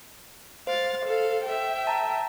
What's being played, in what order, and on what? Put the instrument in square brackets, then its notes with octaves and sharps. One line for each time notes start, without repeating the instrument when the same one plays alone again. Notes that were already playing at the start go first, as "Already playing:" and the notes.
[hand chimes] C5 [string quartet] F5 A6
[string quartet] A4 F5
E5 G5
[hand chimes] A5 A#5